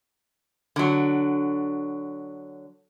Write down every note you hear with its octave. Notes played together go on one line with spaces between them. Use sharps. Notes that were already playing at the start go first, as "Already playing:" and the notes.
D3 F#3